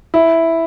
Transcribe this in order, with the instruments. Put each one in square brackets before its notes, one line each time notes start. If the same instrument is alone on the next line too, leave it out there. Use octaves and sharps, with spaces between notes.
[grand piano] E4